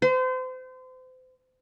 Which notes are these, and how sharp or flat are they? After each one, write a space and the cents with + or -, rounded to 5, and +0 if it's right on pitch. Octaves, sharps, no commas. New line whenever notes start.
C5 -35